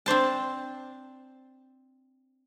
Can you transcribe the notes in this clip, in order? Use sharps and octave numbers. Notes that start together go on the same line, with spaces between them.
C4 D4 C5 A5